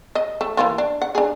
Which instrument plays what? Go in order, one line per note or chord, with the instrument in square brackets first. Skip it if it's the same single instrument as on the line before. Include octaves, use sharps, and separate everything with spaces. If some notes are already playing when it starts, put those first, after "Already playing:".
[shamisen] D#5
A3
E3 A#3 F4
D4
F#5
D4 G#4